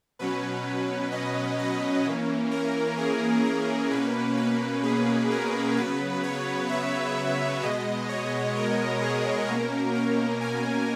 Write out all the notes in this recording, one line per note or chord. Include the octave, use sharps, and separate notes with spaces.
B2 F#3 C#4 B4
D#5
D#5
E3 A#3 C#4
A#4
G#4
A#4
B2 A#3 C#4 B4
B4
G#4
A#4
C#3 F#3 B3 B4
C#5
E5
B2 G#3 B3 D#5
C#5
A#4
G#4
B2 A#3 C#4 A#4
A#4
G#5